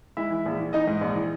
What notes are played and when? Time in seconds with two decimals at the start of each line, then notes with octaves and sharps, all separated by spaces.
0.17 G#3 E4 E5
0.30 E3
0.46 A#1
0.59 E3
0.73 E3 D#4 D#5
0.87 G#2
1.01 A#1
1.15 E3